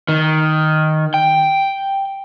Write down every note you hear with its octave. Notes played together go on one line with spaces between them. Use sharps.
D#3
G5